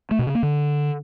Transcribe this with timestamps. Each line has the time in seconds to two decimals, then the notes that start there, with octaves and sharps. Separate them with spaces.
0.11 A3
0.19 B2
0.27 C#3
0.35 A#3
0.43 D3